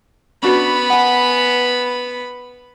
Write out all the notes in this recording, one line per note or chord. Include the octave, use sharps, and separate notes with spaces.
B3 C#4 D4 F#4 B5
F#5 G#5